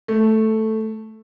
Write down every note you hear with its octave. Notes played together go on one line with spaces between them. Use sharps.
A3